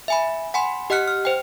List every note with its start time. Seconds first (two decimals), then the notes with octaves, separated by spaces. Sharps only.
0.08 E5 G#5 B5
0.54 F#5 G#5 B5 C6
0.90 G4 D#5 F#5 F6 F#6 C#7
1.08 F6
1.25 C5 G5